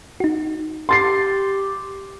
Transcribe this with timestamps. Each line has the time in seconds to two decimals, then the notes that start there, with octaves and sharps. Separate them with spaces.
0.20 D#4 F#4
0.89 G4 C6 A6 C7